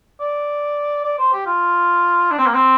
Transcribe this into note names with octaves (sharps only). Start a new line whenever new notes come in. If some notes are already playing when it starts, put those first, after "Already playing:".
D5
D5
C5
G4
F4
D4
C4
A#3
C4